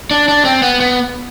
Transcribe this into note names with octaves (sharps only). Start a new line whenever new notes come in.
D4
D4
C4
B3
B3